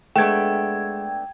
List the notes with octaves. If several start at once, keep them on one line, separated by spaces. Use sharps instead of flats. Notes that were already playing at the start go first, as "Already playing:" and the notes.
G#3 A3 B3 D4 G5 G#6